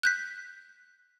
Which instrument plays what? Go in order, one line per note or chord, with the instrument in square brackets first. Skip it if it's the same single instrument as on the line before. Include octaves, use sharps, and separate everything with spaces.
[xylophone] F#6 G6 B6